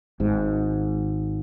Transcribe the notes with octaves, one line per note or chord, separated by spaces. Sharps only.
G#1 G#2